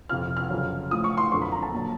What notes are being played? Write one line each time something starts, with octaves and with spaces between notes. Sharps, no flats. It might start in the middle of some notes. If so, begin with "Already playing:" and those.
F2 C3 F3 F6
F6
F2 C#3 F#3
A2 F3 D#6
C#6
C6
F2 D3 F#3 C#6
B5
A#5
A5
A#2 F#3